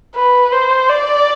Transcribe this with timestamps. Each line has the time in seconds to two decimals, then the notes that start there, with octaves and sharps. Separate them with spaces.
0.15 B4
0.52 C5
0.89 D5